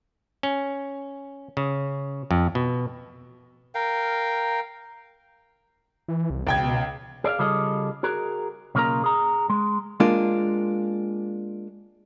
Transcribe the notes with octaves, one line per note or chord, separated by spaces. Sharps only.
C#4
C#3
F2
B2
A#4 F5 G5
E3
C2
C#2 B2 G5 G#6
G#4 D5 E5 F5
C#3 G3 F4 G#4 A4 D#5
F#4 G#4 A#4
B1 C#3 A#3 F4 A#4 A#5
G#4 A#5
G#3
G#3 A#3 D4 F4